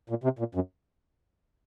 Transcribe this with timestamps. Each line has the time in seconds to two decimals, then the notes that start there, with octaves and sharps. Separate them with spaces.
0.10 A#2
0.24 C3
0.39 A#2
0.55 F#2